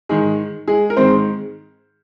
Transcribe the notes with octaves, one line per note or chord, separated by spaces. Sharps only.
G#2 D#3 G#3 G#4
G#3 G#4
A#4
G#2 D#3 G#3 C4 C5